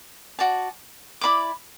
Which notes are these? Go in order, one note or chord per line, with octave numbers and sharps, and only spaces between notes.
F#4 D5 A5
E4 D5 B5 D6